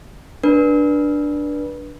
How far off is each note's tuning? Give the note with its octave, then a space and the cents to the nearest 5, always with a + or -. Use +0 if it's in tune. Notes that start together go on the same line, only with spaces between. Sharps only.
D4 +0 B4 -30